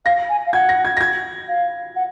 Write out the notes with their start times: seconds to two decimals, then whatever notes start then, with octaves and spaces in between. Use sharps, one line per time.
0.05 F5 A#6
0.29 G#5
0.46 F5
0.53 F#5 G#6
0.69 A#6
0.85 G#6
0.97 A#6
1.01 G#6
1.48 F5
1.96 F#5